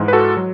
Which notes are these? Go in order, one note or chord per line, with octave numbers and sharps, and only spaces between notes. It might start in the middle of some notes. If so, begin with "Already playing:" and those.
Already playing: G#2 E3 G#3
B4
F#4 A4
F#3